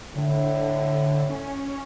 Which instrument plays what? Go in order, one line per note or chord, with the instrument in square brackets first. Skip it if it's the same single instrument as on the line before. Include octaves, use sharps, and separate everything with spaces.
[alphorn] A2 [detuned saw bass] D3
[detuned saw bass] C#4